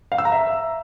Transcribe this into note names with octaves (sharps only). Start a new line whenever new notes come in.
F5
E6
A#5
E5